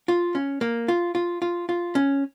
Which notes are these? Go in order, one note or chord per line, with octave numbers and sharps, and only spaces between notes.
F4
C#4
A#3
F4
F4
F4
F4
C#4